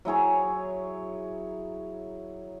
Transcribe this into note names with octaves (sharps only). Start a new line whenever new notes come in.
F#3 E4 G#4 C#5